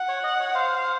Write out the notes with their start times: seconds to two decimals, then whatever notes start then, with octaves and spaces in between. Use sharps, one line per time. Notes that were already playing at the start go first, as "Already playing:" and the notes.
Already playing: F#5
0.08 C#5
0.24 D#5
0.40 C#5
0.55 C5 F5